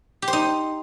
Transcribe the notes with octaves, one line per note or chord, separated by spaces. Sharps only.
G4
C5
D#4